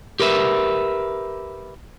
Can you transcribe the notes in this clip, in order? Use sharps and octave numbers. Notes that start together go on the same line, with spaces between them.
G4 A#4 B4 E5